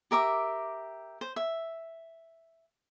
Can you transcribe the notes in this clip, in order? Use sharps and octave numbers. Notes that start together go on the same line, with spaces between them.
G4 A#4 E5 D6
C5
E5